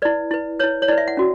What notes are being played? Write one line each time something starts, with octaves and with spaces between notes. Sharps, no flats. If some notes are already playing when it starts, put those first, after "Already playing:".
E4 B4 D5
E4 B4
E4 B4 C#5
C#5
E4 B4 D5
E5
F#5
C#4 F#4